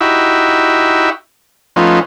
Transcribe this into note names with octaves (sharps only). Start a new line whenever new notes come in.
D#4 E4 F#4 G4 E5
F3 A3 B3 C#4 D#4 F4